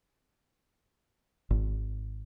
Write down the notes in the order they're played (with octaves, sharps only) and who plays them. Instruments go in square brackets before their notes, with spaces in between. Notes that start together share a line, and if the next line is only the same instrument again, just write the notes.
[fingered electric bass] G#1